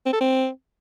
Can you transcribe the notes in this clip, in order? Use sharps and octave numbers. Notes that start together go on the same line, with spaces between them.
C4
A4
C4